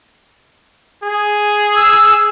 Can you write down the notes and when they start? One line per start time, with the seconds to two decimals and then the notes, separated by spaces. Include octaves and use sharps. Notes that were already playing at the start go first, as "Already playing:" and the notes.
1.03 G#4
1.74 E6